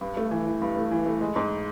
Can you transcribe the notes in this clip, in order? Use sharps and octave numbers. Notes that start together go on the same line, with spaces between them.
G2
A3
E3
E3
G2
A3
E3
A3
G#3
G#2